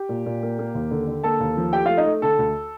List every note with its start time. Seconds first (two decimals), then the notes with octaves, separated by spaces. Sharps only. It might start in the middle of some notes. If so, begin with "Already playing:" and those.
Already playing: G4
0.09 A#2
0.26 A#2
0.43 A#3
0.59 A#3
0.75 D#2
0.91 D3
1.07 D3
1.24 A#3 A4 A5
1.40 D#2
1.57 F3
1.73 A3 G4 G5
1.85 A3 F4 F5
1.97 D#4 D#5
2.05 A3
2.22 D3 A4 A5
2.39 D2